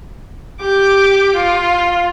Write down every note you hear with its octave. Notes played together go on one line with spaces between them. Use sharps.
G4 D6
F4